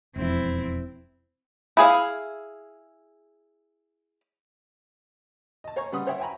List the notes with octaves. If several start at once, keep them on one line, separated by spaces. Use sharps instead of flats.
E1 F2 C4 E4
E4 G#4 F5
D#5 A5
C5 C#5 G#5 A#5 C#6
C#3 G3 B4 F#5 C6 D#6
C5 C#5 E5 F#5 G5 C6
E5 G5 G#5 A#5 B5